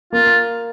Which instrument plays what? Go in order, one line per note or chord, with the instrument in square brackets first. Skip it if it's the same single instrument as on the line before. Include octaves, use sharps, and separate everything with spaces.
[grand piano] A#3 [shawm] F4